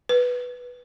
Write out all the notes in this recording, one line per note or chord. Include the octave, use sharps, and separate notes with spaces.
B4